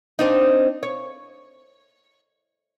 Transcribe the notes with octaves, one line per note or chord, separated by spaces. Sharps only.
C4 D4 D#4
C#5